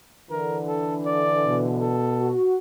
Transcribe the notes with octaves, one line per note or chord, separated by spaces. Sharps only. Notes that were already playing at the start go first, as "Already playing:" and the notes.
D3 E3 A#4
A4
D5
B2
A4
F#4